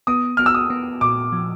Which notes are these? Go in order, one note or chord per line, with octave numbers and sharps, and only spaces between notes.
B3 D#6
B3 F6
E6
D#6
B3
A#2 D6
F3